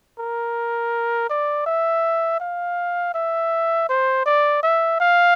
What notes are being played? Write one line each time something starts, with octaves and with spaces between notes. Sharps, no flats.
A#4
D5
E5
F5
E5
C5
D5
E5
F5